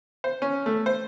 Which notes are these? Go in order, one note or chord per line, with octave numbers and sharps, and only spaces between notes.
C5
C#4
A3
C5